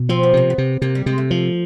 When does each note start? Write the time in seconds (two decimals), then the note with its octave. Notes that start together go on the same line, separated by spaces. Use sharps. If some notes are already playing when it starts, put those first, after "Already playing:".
Already playing: B2
0.09 F3 C4
0.23 B3
0.33 C3 A#3
0.50 B3
0.58 C3
0.82 C3 A#3
0.95 G3
1.06 C3 G#3
1.18 A3
1.31 F3